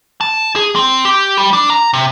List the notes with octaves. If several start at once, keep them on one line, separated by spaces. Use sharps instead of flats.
A5
G#4
C4
G4
G3
D4
A#5
C3